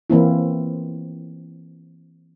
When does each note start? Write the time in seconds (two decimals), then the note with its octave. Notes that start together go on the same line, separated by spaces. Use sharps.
0.10 E3 A#3 C4 E4